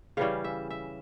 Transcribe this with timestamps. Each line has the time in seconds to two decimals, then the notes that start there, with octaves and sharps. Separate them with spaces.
0.17 C#3 E3 G3 C#4 F5
0.44 E5
0.70 E5